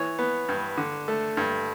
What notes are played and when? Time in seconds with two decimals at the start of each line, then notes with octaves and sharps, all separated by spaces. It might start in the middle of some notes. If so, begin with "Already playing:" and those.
Already playing: E3 C#5
0.19 B3
0.49 G2
0.77 D3
1.08 A3
1.37 G2